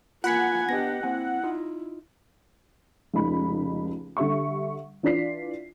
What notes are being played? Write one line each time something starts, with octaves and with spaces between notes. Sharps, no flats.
A#3 F4 F#5 G#5 B5 B6
B3 D4 G4 B4 D#5 A#6
A#3 C4 E4 G#5
D#4 F4
F1 C#2 D#4 B5
D3 G3 E5 C#6
E3 D4 F4 D5 B6 C7